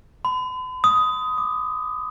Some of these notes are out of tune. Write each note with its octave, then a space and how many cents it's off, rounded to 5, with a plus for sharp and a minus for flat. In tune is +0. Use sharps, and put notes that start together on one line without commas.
B5 +45
D#6 +10
D6 +30